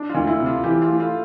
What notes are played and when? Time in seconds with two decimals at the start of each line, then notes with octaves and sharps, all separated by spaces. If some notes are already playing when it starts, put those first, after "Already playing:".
Already playing: D4
0.09 F4
0.15 D2
0.27 E4
0.40 C3
0.46 F4
0.64 E3 G4
0.82 F4
0.88 A3
1.00 F4